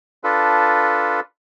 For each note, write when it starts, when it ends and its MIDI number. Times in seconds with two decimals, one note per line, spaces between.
0.24 1.20 62
0.24 1.20 65
0.24 1.20 69
0.24 1.20 71